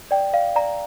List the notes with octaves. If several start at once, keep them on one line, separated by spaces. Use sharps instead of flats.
D5 G5
D5 F5
D5 A#5